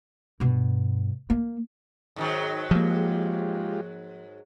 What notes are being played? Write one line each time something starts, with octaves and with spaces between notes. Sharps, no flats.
G2 B2
A#3
G#2 D#3 F#3
F3 G#3 A#3 F4 G4